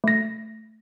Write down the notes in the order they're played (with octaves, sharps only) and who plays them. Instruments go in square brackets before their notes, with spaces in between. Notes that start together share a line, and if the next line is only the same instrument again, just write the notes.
[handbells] A3 A#6